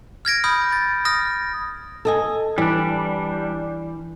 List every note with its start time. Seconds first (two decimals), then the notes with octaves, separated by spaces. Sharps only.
0.25 F6 G#6 A#6 D7
0.44 B5 D#6 F6 G6
0.72 A6
1.05 D#6 F6 A#6
2.05 A4 D#5 G#5
2.58 E3 G3 D4